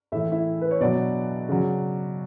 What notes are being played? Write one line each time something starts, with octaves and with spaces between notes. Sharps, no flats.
A2 E3 E5
E4 E5
B4
C#5
B2 F#3 D4 D5
C#3 F#3